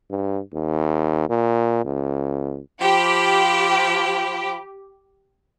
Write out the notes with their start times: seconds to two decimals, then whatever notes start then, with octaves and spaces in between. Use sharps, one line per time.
0.10 G2
0.53 D#2
1.29 A#2
1.85 C#2
2.82 F3 G4 B5